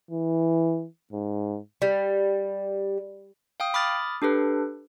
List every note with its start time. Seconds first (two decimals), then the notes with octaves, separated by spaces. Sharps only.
0.11 E3
1.13 G#2
1.82 G3
3.60 F5 G5 D#6
3.74 B5 D6 D#6 F6 A6
4.22 D4 G4 A4 B4